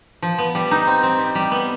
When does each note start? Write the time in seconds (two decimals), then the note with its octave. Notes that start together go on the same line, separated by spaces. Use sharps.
0.22 F3
0.38 B3
0.55 G3
0.71 D#4
0.87 C4
1.03 C4
1.19 G3
1.35 G3
1.51 B3